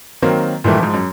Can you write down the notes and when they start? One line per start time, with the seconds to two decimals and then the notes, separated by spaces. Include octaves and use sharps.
0.22 D#3 F#3 A#3 C4
0.64 A#2 D#3 E3 G3 A3
0.79 G#2 F3
0.94 F#2